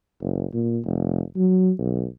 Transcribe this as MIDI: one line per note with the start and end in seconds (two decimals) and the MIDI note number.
0.21 0.45 30
0.53 0.79 46
0.85 1.21 29
1.37 1.71 54
1.78 2.06 35